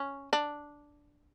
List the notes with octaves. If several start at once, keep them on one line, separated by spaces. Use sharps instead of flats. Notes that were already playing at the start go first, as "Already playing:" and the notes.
Already playing: C#4
D4